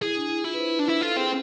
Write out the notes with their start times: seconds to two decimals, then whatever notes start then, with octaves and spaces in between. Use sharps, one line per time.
0.02 E4 G#4
0.16 D4
0.30 E4
0.44 E4 F4
0.54 B4
0.59 C5
0.73 B4
0.79 D4
0.88 E4
1.02 F4 A4
1.16 C4 G#4